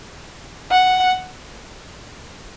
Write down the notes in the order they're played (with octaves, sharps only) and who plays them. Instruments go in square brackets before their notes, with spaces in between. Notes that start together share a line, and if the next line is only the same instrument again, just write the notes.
[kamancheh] F#5